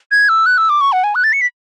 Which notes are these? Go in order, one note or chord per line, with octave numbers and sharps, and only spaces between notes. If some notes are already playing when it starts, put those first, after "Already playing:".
G#6
E6
F#6
E6
D6
C#6
F#5
G#5
F#6
A6
C#7
B6